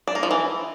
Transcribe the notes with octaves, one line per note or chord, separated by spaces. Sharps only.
D4
A#3
F3
E3